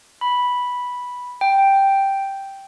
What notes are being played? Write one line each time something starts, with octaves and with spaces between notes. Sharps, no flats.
B5
G5